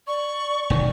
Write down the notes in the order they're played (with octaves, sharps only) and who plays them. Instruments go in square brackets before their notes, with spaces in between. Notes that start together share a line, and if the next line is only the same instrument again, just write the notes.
[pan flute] D5 [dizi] C#6
[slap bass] E1 D#3